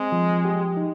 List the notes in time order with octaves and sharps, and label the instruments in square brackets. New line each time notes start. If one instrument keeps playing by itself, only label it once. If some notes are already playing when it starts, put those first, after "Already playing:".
Already playing: [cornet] G#3 [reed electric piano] C4
[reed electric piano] F3
G4
D#4